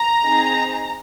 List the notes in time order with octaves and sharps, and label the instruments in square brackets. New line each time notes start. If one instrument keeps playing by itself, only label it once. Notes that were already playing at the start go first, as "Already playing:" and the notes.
Already playing: [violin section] A#5
C4 D#4 G#4